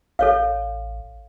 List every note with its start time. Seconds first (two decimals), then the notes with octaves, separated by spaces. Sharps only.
0.19 A1 A4 C#5 F5